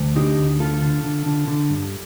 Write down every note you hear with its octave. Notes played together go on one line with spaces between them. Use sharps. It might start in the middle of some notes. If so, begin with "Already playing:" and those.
Already playing: D2
D3 D#4 G4
D2
D3 F4 A4
D3
D3
D3
D3
G2